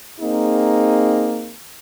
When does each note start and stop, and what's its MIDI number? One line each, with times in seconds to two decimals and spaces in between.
0.20 1.51 58
0.20 1.51 60
0.20 1.51 63
0.20 1.51 68